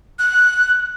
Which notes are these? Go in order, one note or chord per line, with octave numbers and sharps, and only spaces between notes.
F#6